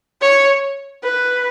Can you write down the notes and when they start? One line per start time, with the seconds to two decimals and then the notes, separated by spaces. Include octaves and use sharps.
0.22 C#5
1.03 B4